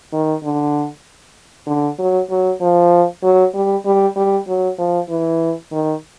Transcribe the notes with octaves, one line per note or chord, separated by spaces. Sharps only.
D#3
D3
D3
F#3
F#3
F3
F#3
G3
G3
G3
F#3
F3
E3
D#3